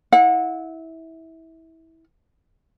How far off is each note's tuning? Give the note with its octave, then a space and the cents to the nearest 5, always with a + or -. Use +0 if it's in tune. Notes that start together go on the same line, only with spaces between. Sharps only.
E4 -20 F#5 -35